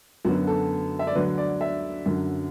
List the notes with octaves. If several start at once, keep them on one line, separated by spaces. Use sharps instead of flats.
F#2 D3 F#3 B3 F#4
A4
E5
D5
D2 D3 F#3 B4
D5
E5
F#2 D3 F#3